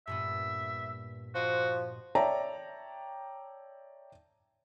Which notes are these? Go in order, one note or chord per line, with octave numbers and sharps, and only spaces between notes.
G2 A#2 B3 E5
F3 F#4 C5 D#5
C#5 D5 E5 G5 A5 A#5